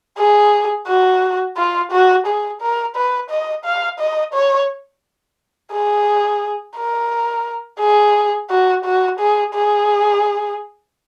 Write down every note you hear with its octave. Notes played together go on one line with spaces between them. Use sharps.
G#4
F#4
F4
F#4
G#4
A#4
B4
D#5
F5
D#5
C#5
G#4
A#4
G#4
F#4
F#4
G#4
G#4